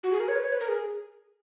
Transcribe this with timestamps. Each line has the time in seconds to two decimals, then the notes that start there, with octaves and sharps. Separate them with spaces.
0.03 F#4
0.12 G#4
0.20 A#4
0.28 C#5
0.36 B4
0.44 C#5
0.52 B4
0.60 A#4
0.69 G#4